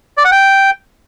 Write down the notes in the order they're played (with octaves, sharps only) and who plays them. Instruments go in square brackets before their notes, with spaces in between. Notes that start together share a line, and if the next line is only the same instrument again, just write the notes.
[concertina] D5
F#5
G5